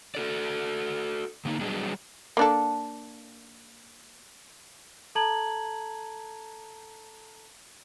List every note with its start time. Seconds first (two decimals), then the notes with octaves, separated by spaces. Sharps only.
0.15 F#4 A4 D5
1.45 D3 A#3 C#4 D#4
1.61 F#3 G3 B3 D4 G#4 D#5
2.37 A#3 D4 A4
5.15 A4 A5 A#5 G#6 F#7